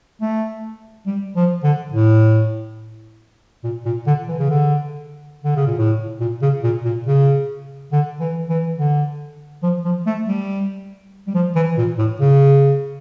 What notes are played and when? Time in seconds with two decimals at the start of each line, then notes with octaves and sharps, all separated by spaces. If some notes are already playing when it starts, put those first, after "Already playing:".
0.21 A3
1.06 G3
1.36 F3
1.63 D3
1.92 A2
3.64 A#2
3.85 A#2
4.07 D3
4.28 E3
4.40 C#3
4.50 D3
5.44 D3
5.56 C#3
5.67 A#2
5.78 A2
6.20 A#2
6.42 C#3
6.64 A#2
6.85 A#2
7.07 C#3
7.92 D3
8.20 E3
8.49 E3
8.78 D3
9.63 F3
9.84 F3
10.06 A3
10.28 G3
11.27 G3
11.35 F3
11.55 E3
11.78 A#2
11.98 A2
12.20 C#3